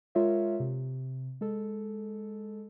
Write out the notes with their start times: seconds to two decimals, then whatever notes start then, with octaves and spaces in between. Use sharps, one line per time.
0.15 G#3 F4 A#4 C#5 E5
0.60 C3
1.41 G#3 A4